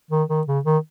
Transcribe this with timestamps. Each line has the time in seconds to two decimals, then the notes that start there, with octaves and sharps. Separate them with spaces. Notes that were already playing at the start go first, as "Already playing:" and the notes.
0.11 D#3
0.29 D#3
0.47 C#3
0.65 D#3